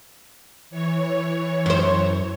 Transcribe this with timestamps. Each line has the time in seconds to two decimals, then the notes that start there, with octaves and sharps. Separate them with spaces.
0.70 E3 C#5
1.66 F#2 C5